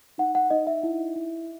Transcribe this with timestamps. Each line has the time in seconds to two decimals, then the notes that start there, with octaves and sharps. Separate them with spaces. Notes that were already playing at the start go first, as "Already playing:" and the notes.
0.18 D#4 F#5
0.35 F#5
0.50 D#4 D#5
0.67 E5
0.83 E4
1.16 E4